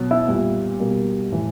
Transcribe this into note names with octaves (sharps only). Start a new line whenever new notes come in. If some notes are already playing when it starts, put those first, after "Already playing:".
Already playing: B2 F#3
E4
A#2 G3 B3
B2 G3 A#3
A2 E3 A3